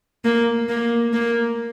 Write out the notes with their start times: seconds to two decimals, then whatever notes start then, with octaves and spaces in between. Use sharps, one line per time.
0.24 A#3
0.69 A#3
1.13 A#3